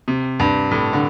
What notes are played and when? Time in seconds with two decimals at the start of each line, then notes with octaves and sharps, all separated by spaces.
0.08 C3
0.40 G2
0.71 A2
0.93 D3